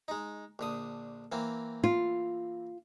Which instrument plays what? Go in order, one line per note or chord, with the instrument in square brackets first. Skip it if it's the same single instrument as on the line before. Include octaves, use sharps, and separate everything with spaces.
[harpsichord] G#3 D#4
A#1 D3 D#6
E3 A#3 C4
[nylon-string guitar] F4